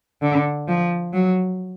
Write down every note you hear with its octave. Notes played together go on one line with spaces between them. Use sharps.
D3
F3
F#3